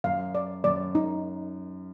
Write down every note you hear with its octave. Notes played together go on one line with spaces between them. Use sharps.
F#2 F5
D5
F#2 D5
D#4